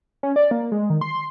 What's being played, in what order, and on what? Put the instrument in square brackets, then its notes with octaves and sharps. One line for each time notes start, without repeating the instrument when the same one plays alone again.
[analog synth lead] C#4
D5
A#3
G#3
D#3
C6